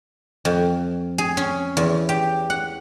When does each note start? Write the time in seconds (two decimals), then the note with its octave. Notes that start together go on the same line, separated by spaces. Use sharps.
0.45 F2
1.18 G#4
1.37 C#4
1.77 E2
2.09 G4
2.50 F#5